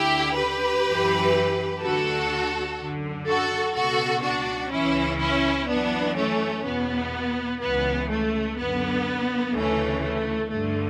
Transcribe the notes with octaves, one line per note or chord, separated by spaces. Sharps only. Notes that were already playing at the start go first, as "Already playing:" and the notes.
Already playing: D2 D3 E4 G4
G4 B4
F#2 E3
D2 D3 F#4 A4
F#2 D3
F#4 A4
C#2 B2 F#4 A4
D4 F#4
C#2 C#3 E3 C#4 E4
C#4 E4
F#2 E3 B3 D4
A3 C#4
E2 B2 B3
C#2 C#3 E3 B3
A3
F#2 D3 B3
D2 C#3 E3 A3 C#4
A3
G2 D3 A3